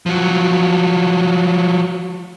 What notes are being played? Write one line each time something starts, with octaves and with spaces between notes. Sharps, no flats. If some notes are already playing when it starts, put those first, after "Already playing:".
F3 F#3